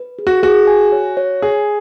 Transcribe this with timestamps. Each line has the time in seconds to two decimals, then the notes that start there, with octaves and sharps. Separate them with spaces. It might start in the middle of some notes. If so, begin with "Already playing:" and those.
Already playing: B4
0.19 G#4
0.27 F#4
0.43 F#4 G#4
0.67 G#5
0.92 C#5
1.17 C#5
1.42 G#4 G#5